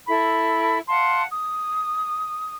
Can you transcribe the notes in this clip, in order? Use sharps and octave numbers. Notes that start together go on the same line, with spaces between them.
E4 A4 B5
F5 F#5 A5 C6
D#6